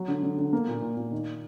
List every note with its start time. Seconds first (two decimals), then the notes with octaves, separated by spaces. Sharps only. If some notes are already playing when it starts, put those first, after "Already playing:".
Already playing: F#3
0.08 D3
0.23 D3
0.38 D3
0.53 A#3
0.68 A#2
0.82 A#2
0.97 A#2
1.12 D#3